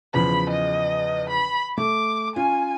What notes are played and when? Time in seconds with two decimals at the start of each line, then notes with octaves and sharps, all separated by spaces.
0.14 E2 C#3 F3 B5
0.50 D#5
1.30 B5
1.78 A3 D6
2.36 C#4 F4 G#5